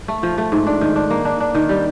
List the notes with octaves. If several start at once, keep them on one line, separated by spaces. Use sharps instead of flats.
A3
F3
A3
G#2
D4
D#3
D4
A#3
D4
D4
D#3
G3